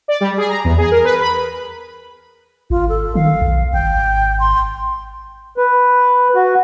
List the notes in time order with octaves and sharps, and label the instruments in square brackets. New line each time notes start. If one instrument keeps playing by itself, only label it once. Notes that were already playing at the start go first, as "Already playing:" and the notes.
[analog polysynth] D5
G3
G#4
A#5
E2
G#4
A#4
B4
B5
[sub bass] G#1 [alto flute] F4
[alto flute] A4
[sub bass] D#3 [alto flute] F5
[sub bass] B1
[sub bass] G#1 [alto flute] G5
[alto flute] C6
[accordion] B4
F#4